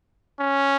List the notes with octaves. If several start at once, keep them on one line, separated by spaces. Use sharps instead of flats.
C#4